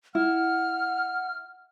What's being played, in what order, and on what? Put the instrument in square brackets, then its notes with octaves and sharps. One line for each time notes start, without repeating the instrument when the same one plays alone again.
[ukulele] E4 [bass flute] F#5 [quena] F6